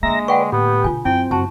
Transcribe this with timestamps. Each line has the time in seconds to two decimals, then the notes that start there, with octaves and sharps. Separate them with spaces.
0.03 D3 G#3 A#3 E5 A#5 A#6
0.28 B4 D5 F#5 G5 C#6
0.52 A2 B3 G4
0.84 B2 D3 F4 G#5
1.05 F#2 C4 E4 G5
1.31 F#2 C#3 F#4 A5